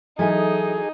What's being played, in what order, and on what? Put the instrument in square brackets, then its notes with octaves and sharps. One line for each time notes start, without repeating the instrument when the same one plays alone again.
[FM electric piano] E3 F#3 [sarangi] D#4 [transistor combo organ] G#4 [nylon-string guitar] A4 E5 G#5